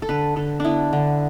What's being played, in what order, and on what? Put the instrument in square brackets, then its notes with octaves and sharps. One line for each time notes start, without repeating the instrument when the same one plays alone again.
[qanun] A4
D3 B4
D3 A4
B3 D4 E4
D3